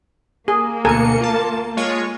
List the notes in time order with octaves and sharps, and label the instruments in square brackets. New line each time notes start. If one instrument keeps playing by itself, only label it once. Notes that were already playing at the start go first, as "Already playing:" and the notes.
[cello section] A#3 [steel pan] G#4
[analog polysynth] D2 B2 C#7 [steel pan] A4 A#4 G#5
[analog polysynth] F4 A5
G#3 F4 C#5